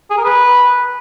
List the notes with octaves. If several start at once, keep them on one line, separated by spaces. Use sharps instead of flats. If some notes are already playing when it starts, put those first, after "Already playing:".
G#4
A#4
B4